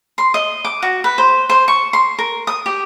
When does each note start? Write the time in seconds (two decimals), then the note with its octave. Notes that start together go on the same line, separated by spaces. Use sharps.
0.18 C6
0.34 D#5
0.65 D6
0.82 F#4
1.04 B4
1.18 C5
1.49 C5
1.68 C#6
1.93 C6
2.19 A#4
2.47 D#6
2.66 G4